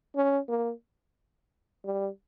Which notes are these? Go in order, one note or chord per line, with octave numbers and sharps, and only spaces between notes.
C#4
A#3
G3